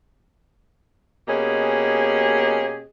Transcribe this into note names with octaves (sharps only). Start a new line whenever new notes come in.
B2 A#3 C#4 G4 G#4 D#5